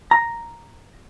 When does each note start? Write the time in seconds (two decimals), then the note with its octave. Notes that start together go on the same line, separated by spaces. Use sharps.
0.11 A#5